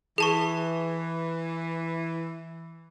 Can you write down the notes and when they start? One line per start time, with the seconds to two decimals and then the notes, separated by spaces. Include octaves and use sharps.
0.18 E3 G#4 A5 C#6